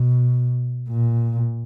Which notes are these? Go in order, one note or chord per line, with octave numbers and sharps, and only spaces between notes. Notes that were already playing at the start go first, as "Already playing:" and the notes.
Already playing: B2
A#2